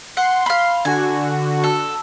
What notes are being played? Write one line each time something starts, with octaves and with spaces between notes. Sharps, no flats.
F#5 C6
F5 B5
D3 F#4 G#5
A4